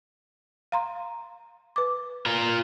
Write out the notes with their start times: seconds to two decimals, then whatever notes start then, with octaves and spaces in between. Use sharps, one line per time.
0.72 F5 A#5 C6
1.76 B4 D6
2.26 F4 A#4